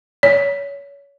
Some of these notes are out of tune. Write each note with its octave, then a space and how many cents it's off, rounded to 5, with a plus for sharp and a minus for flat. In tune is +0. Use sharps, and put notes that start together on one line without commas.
C#5 +25